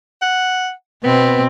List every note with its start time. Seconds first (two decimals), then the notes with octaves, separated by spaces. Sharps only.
0.22 F#5
1.04 B2 B3 C4